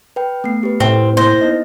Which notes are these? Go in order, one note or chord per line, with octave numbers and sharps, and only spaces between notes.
B4 G5
A3 B3 C7
G4 B4
A2 C4
A#3 E4 C5 A#6
B3 D#4 D#5